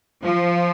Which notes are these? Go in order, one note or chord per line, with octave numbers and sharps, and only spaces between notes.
F3